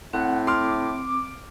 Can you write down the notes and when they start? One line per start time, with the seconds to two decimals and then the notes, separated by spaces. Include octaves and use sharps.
0.13 A2 C4 F#5
0.47 C6 D6 F6